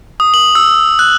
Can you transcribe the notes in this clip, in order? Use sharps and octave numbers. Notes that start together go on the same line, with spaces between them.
D#6
F#7
E6
F#6